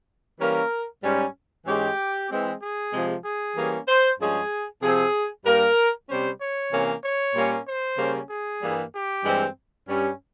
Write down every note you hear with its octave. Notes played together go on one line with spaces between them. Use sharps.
E3 G3 A#3 C#4 A#4
G#2 G3 C#4
G#2 E3 G#3 C#4 G4
E3 G#3 C4
G#4
C3 F3 G#3
G#4
E3 G3 A#3 C#4
C5
G2 F3 G#3 C#4 G#4
C3 F3 C4 G#4
G2 G3 A#3 A#4
C3 G3 C#4 C5
C#5
C3 E3 A#3 C#4
C#5
A#2 G3 A#3 C#4
C5
C#3 G3 A#3 C#4
G#4
G2 E3 G3 A#3
G4
G2 E3 G#3 C4
G2 G3 C#4